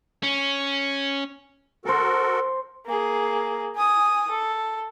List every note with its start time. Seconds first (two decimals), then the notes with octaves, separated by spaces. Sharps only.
0.23 C#4
1.85 F#4 A4 A#4 C5 A5
2.86 A#3 G#4
3.75 G#5 D#6
4.30 A4